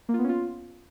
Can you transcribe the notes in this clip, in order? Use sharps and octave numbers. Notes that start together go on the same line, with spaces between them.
A#3
F4
B3
C#4
F4